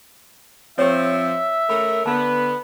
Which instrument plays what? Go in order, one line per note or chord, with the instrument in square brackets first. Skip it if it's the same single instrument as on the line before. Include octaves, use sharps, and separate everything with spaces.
[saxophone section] F3 C4 [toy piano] G4 C#5 [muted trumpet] E5
[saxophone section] A3 C#4 A#4 [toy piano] B5
[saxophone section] D3 B3 [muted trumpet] B4 [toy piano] A5